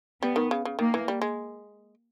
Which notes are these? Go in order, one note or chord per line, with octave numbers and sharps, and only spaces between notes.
G3 B3
D#3
C#3
C#3
D#3 A#3
E3
G3
G#3